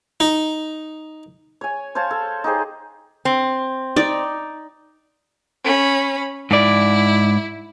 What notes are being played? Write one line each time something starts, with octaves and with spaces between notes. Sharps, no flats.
D#4
C#5 G#5
C5 C#5 F5 A5
A4
D#4 G4 G#4 C5
C4
D#4 D5
C#4 B5
G#2 E4 D5